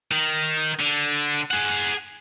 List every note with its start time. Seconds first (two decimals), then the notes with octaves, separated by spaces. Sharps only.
0.11 D#3
0.79 D3
1.51 G#4 F#5